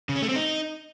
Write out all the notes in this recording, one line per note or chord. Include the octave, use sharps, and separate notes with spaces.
C#3
C#4
A3
C4
D#4